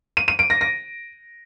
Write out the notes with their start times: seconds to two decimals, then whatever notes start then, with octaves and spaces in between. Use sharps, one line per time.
0.17 D#7
0.28 D#7
0.39 D7
0.50 A#6
0.61 A#6